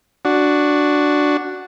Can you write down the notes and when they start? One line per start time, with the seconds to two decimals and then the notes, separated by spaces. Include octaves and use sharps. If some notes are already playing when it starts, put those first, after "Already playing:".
0.25 D4 F#4